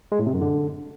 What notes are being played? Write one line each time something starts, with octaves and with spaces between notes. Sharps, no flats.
G#3
A2
C3
F#2
D3